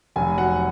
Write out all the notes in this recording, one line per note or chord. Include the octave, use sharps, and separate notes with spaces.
F1 G#5
F#3 F#5